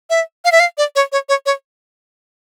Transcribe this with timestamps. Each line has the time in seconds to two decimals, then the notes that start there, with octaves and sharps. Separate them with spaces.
0.10 E5
0.45 F5
0.52 E5
0.60 F5
0.78 D5
0.95 C#5
1.12 C#5
1.29 C#5
1.46 C#5